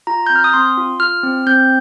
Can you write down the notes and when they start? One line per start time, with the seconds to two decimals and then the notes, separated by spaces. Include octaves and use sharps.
0.07 F4 A#5
0.27 C4 G6
0.35 F6
0.44 D#6
0.53 C4 C6
0.77 F4
1.00 F4 F6
1.23 C4
1.46 C4 G6